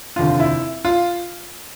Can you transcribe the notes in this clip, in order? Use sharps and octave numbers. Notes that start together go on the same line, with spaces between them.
F1 D#2 D3 F4
E4
F4